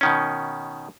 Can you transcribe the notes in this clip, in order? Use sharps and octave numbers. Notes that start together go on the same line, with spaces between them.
B2 D#3 C#4